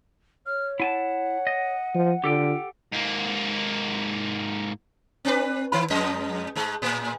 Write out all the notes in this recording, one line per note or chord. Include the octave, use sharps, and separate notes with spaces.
C#5 F6
E4 F#5 G#5 A5
D#5
F3
D3 F4 G4 A4 G5
G#2 A#3
C4 D4 B4
D#3 E4
F2 G#3 D#5
G#2 G#3
A2